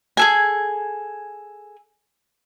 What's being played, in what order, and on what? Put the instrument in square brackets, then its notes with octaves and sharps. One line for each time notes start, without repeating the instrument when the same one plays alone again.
[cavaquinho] G#4 A4 G#5